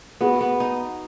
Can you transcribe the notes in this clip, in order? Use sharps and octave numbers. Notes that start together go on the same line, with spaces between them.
B3 F#4 G#4
B3
D#4